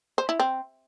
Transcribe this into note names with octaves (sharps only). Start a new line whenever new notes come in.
C5
E4
C4